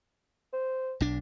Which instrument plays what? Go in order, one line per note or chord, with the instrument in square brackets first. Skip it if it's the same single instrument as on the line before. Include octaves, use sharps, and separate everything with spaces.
[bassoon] C5
[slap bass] B1 D4